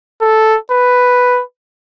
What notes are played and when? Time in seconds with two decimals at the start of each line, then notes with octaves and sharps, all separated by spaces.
0.22 A4
0.72 B4